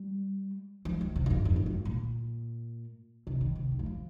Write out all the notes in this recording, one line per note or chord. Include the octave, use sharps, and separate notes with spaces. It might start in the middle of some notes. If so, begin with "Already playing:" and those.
Already playing: G3
F3
D#3
C3
F2
G2
F2
A#2
G2
A#2
C3
D#3
C3
D#3
G3
F3